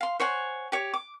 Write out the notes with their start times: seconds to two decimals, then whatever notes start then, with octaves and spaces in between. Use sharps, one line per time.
0.01 F5 C6
0.20 C5 C#5 F#5 G#5
0.72 G4 C#5
0.94 D6